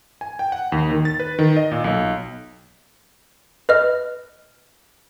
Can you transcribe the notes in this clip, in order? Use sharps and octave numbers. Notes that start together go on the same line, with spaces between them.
G#5
G5
F#5
D#2
D#3
A6
B4
D#3
D#5
A#2
B1
B4 D#5 F6